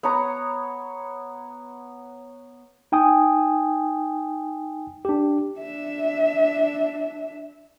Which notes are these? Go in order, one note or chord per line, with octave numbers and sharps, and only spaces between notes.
B3 C#5 A#5
D#4 G5 G#5 D#6
D4 G4
D4 E5